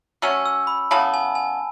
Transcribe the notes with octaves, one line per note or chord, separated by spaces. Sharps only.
F#3 A3 C#4 E6
E6
B5
C#3 E3 B3 A5
G#5
G#5